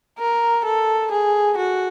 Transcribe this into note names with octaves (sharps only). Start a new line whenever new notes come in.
A#4
A4
G#4
F#4